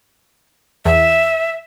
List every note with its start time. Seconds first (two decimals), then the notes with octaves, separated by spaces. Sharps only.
0.85 E2 E5